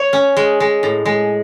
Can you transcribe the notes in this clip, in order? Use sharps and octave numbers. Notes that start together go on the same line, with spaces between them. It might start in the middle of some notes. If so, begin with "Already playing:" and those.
Already playing: C#5
C#4
G#3
G#3
A2
G#3